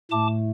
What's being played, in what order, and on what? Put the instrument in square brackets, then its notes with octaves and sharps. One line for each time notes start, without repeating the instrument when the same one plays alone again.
[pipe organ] A2 A3 A5 D6